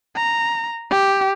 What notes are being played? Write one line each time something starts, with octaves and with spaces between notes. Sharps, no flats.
A#5
G4